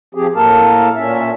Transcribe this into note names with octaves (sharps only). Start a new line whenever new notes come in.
F3 C4 G4 G#4
A2 A#3 A4 A#4 F5 A5
A#2 C#4 E5